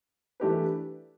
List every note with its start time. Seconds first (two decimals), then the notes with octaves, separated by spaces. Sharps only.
0.40 E3 A3 D4 G4 B4